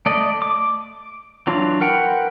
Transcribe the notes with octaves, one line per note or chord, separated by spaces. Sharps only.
A3 D5 D#5
D6
E3 F#3 D4 F4
A#4 B4 F#5 G5